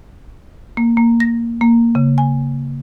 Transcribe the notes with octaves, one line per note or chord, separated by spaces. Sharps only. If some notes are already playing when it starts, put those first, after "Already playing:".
A#3
A#3
A#6
A#3
C#3
G#5